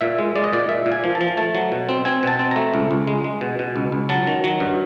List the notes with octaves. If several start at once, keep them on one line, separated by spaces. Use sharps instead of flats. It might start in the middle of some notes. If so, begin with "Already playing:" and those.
A#2 E5
G#3
G#3 D5
D#5
A#2 D5
A#2 E5
A#2
G#5
F3
A5
F3
A3 A5
F#3
B2
C4
C4 G#5
B2 A5
C4
A3 A#5
C#2
C#2
G#3
G#3
B2
B2
C#2
C#2
F#3 A5
D#3
F#3
G2